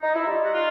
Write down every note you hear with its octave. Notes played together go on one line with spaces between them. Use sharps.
D#4
E4
G3 D#4 F4
G3 F#4
D#4 F4